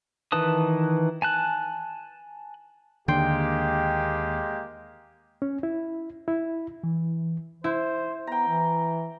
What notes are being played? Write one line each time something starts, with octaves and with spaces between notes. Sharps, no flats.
D#3 E3 B4 A5 D#6
G#5 A5 F#6
D#2 D3 G#3 A#3 G4 G5 C6
C#4
E4
E4
E3
E4 C5
B3 G5 A#5
E3